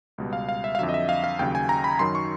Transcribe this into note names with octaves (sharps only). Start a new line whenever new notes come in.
C#2 B2 G3
F5
F5
E5
F5
F2 D3 F#3 E5
D#5
E5
F5
F5
D#2 C#3 F#3 G5
G#5
A#5
B5
F#2 D#3 F#3 C6
C#6